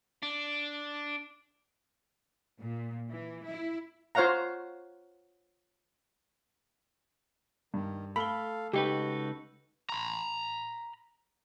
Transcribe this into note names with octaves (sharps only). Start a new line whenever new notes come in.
D4
A#2
E3
E4
F4 C5 C#5 F5 F#5 A#5
G2 D#3
A3 A4 F5 B5 G7
C#2 D#4 F#4 G4 A4 B4
A#5 B5